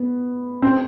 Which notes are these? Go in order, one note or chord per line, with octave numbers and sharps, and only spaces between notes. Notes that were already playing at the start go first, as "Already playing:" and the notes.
Already playing: B3
C4